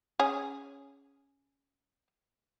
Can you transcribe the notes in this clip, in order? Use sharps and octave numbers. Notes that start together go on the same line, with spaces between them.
C#4 G#4